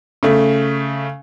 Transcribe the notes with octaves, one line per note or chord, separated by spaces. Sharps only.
C#3 A3